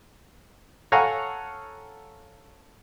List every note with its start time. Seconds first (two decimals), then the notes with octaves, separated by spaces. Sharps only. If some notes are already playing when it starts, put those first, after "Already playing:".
0.92 A4 C#5 F5 F#5 G#5 A#5